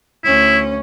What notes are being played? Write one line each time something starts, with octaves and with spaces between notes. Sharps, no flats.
D2 C#4 E4